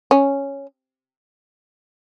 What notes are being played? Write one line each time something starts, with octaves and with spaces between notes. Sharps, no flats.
C#4